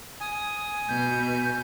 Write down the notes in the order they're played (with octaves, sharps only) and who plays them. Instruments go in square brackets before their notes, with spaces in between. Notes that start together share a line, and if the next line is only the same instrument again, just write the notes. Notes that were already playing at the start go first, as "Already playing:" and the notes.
[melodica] G#5 [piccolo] D#6
[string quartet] B2 [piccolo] G6